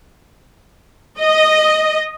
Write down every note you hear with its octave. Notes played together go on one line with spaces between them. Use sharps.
D#5